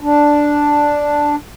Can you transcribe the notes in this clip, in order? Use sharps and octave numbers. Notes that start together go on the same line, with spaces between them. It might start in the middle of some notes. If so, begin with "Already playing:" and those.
D4